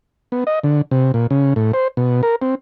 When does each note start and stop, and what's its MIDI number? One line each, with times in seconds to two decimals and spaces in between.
0.32 0.44 59
0.47 0.59 75
0.64 0.82 50
0.91 1.12 48
1.14 1.27 46
1.31 1.54 49
1.56 1.72 45
1.73 1.88 72
1.97 2.22 47
2.23 2.36 70
2.42 2.55 60